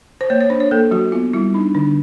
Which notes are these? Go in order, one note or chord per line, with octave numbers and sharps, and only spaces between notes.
C5
A#3 C#5
C#5
D4 C5
C#5
A#3 A4
F#3 F#4
B3 F4
G3 E4
D4 D#4
D3 D4